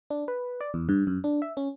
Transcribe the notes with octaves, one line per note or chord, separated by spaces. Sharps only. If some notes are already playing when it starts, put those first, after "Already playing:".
D4
B4
D5
E2
G2
F#2
D4
E5
C#4